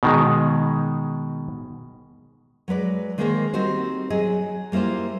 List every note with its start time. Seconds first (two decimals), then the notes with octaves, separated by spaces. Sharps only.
0.03 B2 D#3 G#3
2.68 F#3 G#3 B4 D5
3.18 D#3 G#3 A#3 G#4 A#4 C5
3.54 G3 C4 D#4 F#4 C5
4.10 F#3 G#4 D#5
4.72 G3 A#3 E4 F4 C5